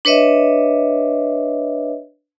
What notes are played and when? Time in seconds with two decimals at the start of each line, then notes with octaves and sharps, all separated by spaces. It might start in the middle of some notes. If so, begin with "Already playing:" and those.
0.05 D4 B4 C#5 D#5 E5